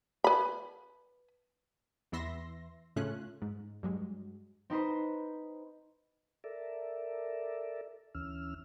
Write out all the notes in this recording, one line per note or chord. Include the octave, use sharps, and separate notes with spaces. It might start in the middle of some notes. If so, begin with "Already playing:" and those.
B4 B5
E2 E3 B3 E5 C6 A#6
A2 C#3 A3 C#4 F4 F#6
G#2
G2 F#3 G#3
C4 D#4 B4 C5
A4 A#4 D5 E5
D2 E3 C#4 E6 F6